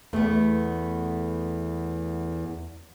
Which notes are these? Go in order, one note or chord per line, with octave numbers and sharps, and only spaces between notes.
E2 A3 B3